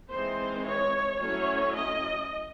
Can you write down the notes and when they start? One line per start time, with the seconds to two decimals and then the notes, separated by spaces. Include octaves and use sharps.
0.11 E3 G#3 C4 D#4 C5
0.66 C#5
1.20 F#3 A3 C#4 E4 C#5
1.76 D#5